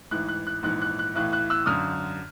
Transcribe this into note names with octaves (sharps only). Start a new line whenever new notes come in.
A1 G#2 E3 F#6
F#6
F#6
A#1 G#2 E3 F#6
F#6
F#6
B1 A2 E3 F#6
F#6
E6 F#6
G#1 F#2 D3 D#6 F6